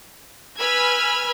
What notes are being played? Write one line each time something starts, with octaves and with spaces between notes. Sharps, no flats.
B4 G#5 B5 E6 F6 G#6